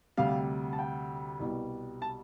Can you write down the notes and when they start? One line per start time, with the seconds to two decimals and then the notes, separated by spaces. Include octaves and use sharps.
0.17 D2 C3 G3 F5
0.73 A5
0.79 G5
1.40 C2 B2 G3
2.02 A5